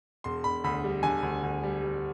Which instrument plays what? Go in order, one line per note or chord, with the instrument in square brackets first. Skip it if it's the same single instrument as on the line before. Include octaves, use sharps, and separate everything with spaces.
[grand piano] E1 C6
E1 B5
D2 B5
G3
D3 G#5
D2
D2
G3
G3